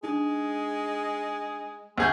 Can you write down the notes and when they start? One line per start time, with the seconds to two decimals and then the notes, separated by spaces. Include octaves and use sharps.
0.04 G#3 D4 D#4 G#4
1.98 D2 G#3 G#4 G6